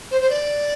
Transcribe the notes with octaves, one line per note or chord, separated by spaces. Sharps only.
C5
C5
D5